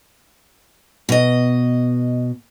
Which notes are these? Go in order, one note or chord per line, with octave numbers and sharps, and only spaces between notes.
B2 D#5